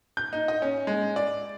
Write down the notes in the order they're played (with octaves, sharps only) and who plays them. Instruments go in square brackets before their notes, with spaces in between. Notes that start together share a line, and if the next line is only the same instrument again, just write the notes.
[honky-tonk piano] G6
D#4
D#5
C#4
G#3
D5